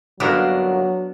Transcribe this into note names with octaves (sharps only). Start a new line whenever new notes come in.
G1 F#2 F#3 A#3 B3 D4 A#4